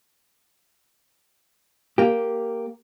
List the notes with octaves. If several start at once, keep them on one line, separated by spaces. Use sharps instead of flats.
A#3 G4